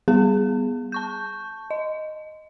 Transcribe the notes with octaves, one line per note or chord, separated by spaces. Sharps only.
G3 B3 G#4
A5 C#6 G6
D#5